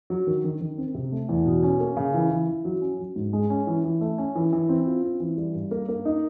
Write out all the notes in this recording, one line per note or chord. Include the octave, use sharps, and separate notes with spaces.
F#3
D#3
D#3
D#3
C4
C3
A3
E2
B2
C#4
A#3
C#3
E3
E3
E3
F#3
C#4
F#3
G#2
G#3
C#4
E3
E3
A3
C#4
E3
E3
C4
F4
C4
E3
G3
G2
A#3
A#3
D#4